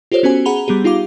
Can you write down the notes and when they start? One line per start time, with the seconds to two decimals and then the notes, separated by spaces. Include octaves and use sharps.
0.12 F4 G4 A4 C5 C#5
0.23 B3 C#4 F#4 C5 G#5
0.45 G#4 F#5 A#5 B5 F7 G7
0.68 G3 B3 G4 G#4
0.84 D#4 F4 G4 F5 D6